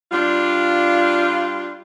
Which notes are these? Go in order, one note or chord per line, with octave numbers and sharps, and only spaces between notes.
G3 D4 F4